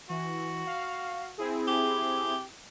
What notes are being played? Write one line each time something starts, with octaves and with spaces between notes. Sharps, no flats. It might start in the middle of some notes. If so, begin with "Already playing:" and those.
E3 F#4
F5
C4 E4 G#4
G4